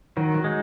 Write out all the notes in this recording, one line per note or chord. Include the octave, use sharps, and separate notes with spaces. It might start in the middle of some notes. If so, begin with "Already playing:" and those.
D#3 F#3 F#4
F#3 F#4
G#3 D#4